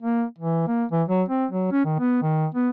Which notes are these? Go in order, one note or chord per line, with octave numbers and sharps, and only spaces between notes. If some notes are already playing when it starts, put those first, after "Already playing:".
A#3
E3
A#3
E3
F#3
C4
F#3
C#4
D#3
B3
D#3
B3